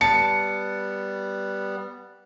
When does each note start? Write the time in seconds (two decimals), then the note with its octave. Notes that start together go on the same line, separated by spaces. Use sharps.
0.01 G3 B3 A5 C#7